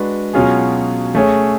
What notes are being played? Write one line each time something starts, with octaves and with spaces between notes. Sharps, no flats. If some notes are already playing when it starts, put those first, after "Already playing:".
Already playing: G#3 D4 F#4 B4
B2 F#3 C#4 F4 G#4
A3 C#4 G#4 C#5